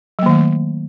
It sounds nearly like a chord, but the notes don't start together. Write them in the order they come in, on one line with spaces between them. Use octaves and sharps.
F#3 A#3 D#3 A3